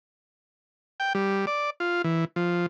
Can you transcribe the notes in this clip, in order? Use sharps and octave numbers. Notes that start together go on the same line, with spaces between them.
G5
G3
D5
F4
E3
F3